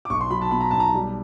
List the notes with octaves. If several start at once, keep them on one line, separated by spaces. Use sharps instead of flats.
D6
B1 C#6
C6
F#3 B5
A5
B2 B5
A#5
B1 A5
A#5
G3